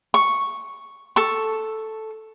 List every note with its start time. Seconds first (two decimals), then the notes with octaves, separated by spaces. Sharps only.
0.14 C#6
1.16 A4 C#6